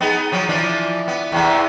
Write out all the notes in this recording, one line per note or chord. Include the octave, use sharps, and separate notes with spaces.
B3 D#4 G#4
F3 F#3
E3 F3 D4
B3
E2 C3 E3